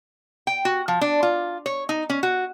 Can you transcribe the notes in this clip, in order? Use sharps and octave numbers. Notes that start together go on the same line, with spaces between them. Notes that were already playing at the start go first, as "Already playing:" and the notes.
G5
F#4
F3
D4
F4
C#5
D#4
C#4
F#4